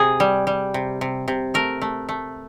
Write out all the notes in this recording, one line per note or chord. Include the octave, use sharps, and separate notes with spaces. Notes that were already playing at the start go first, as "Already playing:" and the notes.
Already playing: C3 G#4
G3
G3
C3
C3
C3
A3 A#4
A3
A3